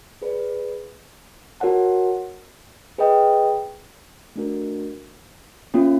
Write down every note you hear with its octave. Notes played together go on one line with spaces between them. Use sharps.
G#4 B4 D5
F#4 A#4 C#5 F#5 A5
G#4 B4 D#5 G5
A3 D4 F#4 A#4
A#3 C#4 F4